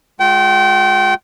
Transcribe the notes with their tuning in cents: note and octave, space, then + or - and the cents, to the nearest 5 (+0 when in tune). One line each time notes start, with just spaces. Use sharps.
G#3 +5 F4 +30 G5 -30